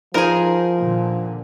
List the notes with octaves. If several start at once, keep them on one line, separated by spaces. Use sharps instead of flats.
F3 D#4 F4 G#4 A#4 C5
A#2 D3